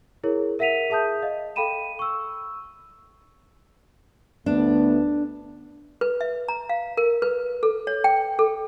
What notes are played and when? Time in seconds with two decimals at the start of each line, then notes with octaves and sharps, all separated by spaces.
0.24 E4 G#4 A#4 C#5
0.59 A#4 E5 F#5 B6 D#7 F7
0.90 G#4 E5 A5 D#6 G6
1.22 D#5 F5
1.56 A4 F5 G5 B5 D#7 E7
1.99 C#6 E6
4.46 D2 A3 B3 D4
6.01 B4
6.21 E5
6.48 A#5
6.69 F5
6.97 A#4
7.22 B4
7.63 A4
7.87 C#5
8.04 G5
8.39 A4